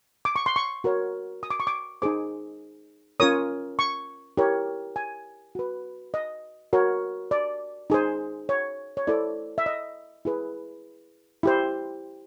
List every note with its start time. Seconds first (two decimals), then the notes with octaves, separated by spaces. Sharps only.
0.25 D6
0.36 C#6
0.46 C6
0.56 C#6
0.84 F#4 A#4 C#5
1.43 D#6
1.51 D6
1.60 C#6
1.67 D6
2.02 D#4 G#4 C5 D6
3.20 C#4 F4 A#4 C#5 D#6
3.79 C#6
4.37 E4 G4 A#4 C#5
4.96 G#5
5.55 F#4 B4
6.14 D#5
6.73 F#4 A#4 C#5
7.31 D5
7.90 D#4 G#4 C5
8.49 C#5
8.97 C#5
9.07 E4 A4 C5 D5
9.58 E5
9.66 D#5
10.25 E4 G#4 B4
11.43 E4 G4 C5